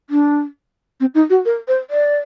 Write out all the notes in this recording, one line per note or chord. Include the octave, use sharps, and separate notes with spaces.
D4
C4
D#4
F#4
A#4
C5
D5